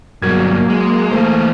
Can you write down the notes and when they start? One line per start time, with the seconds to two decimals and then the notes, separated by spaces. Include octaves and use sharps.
0.22 G2 B2 F#3 A#3 A#4 G#6
0.69 G#3
1.11 E3 G#3 A3 C5